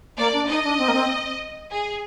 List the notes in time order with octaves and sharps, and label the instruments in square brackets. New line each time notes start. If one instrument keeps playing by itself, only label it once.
[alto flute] A#3 [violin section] D5
[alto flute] D4
[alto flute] D#4 [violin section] D#5
[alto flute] D4
C4
A#3
C4
[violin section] G#4